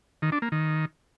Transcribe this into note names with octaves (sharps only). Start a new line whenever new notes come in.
D#3
D4
A#3
D#3